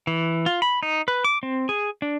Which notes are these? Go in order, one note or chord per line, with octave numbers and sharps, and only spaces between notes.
E3
F4
B5
D#4
B4
D6
C4
G#4
D4